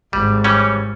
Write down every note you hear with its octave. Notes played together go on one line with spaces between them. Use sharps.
G#1 G#2 G3
E3 G3 C#4